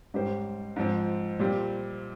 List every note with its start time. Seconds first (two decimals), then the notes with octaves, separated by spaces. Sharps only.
0.14 G#2 G3 C#4 G4 C5
0.76 G#2 F3 C4
1.39 A#2 G3 C4 G4